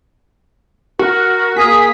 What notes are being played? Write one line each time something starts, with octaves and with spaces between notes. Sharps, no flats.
F#4 A#4
A#3 G#4 B6